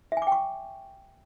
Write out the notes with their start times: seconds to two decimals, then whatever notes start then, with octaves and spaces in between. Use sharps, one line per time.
0.12 E5
0.17 G#5
0.22 D6
0.27 G5
0.32 C#6